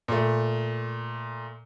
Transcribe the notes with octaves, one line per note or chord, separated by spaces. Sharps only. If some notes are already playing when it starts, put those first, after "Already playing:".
A#2 A3